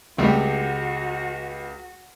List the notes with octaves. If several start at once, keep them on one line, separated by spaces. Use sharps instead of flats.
C#2 G3 A3 C4 F#4 G4